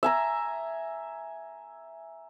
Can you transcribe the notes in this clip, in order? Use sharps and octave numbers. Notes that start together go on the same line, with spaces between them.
E5 G#5 A#5